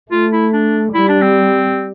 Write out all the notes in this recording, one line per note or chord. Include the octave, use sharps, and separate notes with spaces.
A3 F4
E4
D4
G3 E4
D4
C4